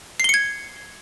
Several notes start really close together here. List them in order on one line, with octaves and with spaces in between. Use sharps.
C7 G7 C#7 G#6